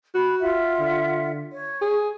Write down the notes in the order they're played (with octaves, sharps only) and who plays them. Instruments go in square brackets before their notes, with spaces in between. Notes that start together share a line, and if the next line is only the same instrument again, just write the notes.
[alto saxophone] F#4 [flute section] B5
[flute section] F4 E5 F#5
[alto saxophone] D3
[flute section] C#5
[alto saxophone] G#4